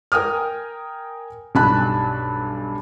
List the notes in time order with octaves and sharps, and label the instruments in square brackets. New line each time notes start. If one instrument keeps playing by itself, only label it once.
[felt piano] A#4 G5 G#5 D#6 F6
B1 G2 G#5 A5 B5 F#6